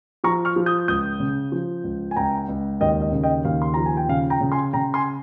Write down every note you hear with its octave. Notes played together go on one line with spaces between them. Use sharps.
F3 A#5 C#6
C#6 F6
F3
D#6 G6
C#2 D#6 G6
C#3
F3
C#2
G#5
C#2 G5 A#5
C#2
D#2 D#5 G5
D#5
C#3
D#5 G5
D#2 F5
C6
F3 A#5
G#5
G5
C#3 F5
G5 A#5
C#3
G#5 C6
C#3 G5 A#5
G#5 C6